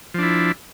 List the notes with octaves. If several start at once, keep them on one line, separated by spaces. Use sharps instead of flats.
F3 D4 E4